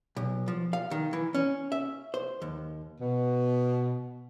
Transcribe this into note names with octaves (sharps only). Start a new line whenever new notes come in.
B1
F3
F5
D#3
E3
C#4
E5
C5
D#2
B2